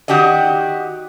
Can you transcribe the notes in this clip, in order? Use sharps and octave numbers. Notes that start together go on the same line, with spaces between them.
D#3 F#4 G4 D5 D#5